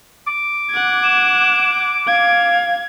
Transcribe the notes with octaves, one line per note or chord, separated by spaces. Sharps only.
D6
F#5 G#6
E7
F5 G#6